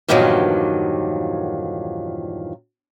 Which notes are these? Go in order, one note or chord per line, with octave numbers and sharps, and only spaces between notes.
E2 G2 A#2 D#3 F3 F#3